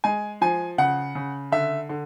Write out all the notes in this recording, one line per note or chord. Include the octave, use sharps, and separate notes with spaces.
G#3 G#5
F3 G#5
C#3 F#5
C#3
D3 E5
D3